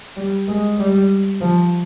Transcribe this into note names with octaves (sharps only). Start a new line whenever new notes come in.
G3
G#3
G3
F3